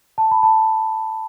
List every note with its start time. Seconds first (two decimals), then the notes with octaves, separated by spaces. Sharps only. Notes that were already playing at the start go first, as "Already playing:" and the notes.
0.18 A5
0.31 B5
0.43 A5